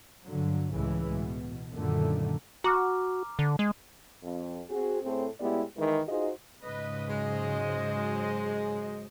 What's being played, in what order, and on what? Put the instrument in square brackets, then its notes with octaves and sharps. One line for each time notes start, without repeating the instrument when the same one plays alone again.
[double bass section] G2 D3 F#3
C#2 A2 C#3 E3 G#3
B2
F#2 A#2 D3 D#3 A3
[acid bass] F#4 [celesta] A#5 D6 F6
[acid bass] D3
G#3
[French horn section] F2
C4 F#4 G#4
A2 A3 C4 G#4 A4 C5
A2 G#3 B3 E4 G4 D5
D#3 E3 G#3
D#4 F4 F#4 G#4 C5 D#5
[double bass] G#2 C#3 [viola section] B4 D#5
[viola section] F#3 C5 D#5 [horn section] G#3